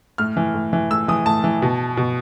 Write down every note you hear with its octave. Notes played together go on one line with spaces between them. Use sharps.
A2 F6
E3
A2
E3
A2 E6
E3 D#6
A2 A5
E3
B2
B2